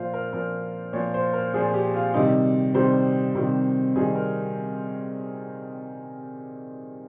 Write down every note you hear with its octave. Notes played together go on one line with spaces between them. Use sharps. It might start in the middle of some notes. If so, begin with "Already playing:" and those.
Already playing: A#2 F3 F4 C5
A#4
A#2 F3 A#4
A#2 F3 C#5
C5
A#4
A#2 F3 G#4
G4
F4
C3 D#3 G3 D#4
C3 D#3 G3 C5
C3 D#3 G3
C3 D#3 G3 G#4
A#4